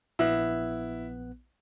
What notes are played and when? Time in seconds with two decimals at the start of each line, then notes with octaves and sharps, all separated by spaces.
0.19 A#1 B3 E4 F#6